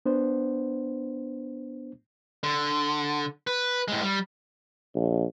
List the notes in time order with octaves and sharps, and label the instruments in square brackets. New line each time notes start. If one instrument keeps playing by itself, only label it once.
[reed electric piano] B3 D4 C5
[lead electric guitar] D3
B4
A2 G#3
G3
[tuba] A#1